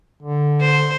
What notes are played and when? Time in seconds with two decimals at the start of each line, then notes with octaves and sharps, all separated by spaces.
0.23 D3
0.61 C5